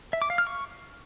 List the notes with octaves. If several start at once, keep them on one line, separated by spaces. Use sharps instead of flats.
E5
D6
F5
F6
C#6